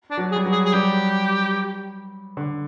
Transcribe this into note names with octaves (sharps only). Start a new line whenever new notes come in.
D4
F#3
G#4
G3
F#3
G#4
G#4
G3 G4
D3